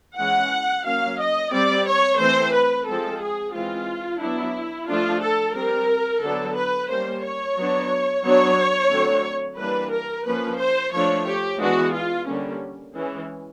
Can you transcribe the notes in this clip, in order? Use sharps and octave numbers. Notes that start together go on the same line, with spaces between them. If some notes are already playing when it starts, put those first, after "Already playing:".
E3 G#3 C#4 F#5
F#3 A#3 C#4 F5
D#5
G3 C4 D5
C#5
E3 A3 C4 C5
B4
F3 G#3 C4 A4
G#4
E3 G#3 C4 F4
F#3 B3 D4 E4
F3 A3 D4 F4
A4
G3 C4 A#4
D3 F#3 B3 D4 A4
B4
G3 A#3 C#4 C5
C#5
F#3 B3 D4
F#3 B3 D4 C#5
D3 F#3 A3 C4
E3 G3 A#3 D4 B4
A#4
F3 A#3 C#4 B4
C5
F3 A3 D4 C#5
G4
E3 G#3 B3 D4 F#4
F4
D3 G3 A#3 C#4
E3 G#3 C#4